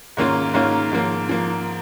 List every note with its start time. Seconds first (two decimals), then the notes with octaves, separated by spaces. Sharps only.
0.17 G#2 D#3 A#3 C#4 F4
0.54 G#2 D#3 A#3 C#4 F4
0.92 G#2 F3 A#3
1.29 F3 A#3